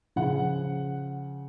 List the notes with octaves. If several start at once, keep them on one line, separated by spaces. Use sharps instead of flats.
C#3 F3 F#5